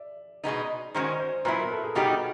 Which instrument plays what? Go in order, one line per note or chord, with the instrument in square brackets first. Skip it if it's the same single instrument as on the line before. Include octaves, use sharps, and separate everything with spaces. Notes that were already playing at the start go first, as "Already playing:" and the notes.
Already playing: [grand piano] D5 E5
[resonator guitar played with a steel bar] B2 G#3 B3 D#4
[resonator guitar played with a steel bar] D#3 G#3 C#4 F#4 [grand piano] C5
[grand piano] C5
[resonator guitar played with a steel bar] A#2 F#3 B3 E4 [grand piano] B4
[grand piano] A#4
A4
G#4
[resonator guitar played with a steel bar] B2 G3 B3 D#4 G4 [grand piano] F#4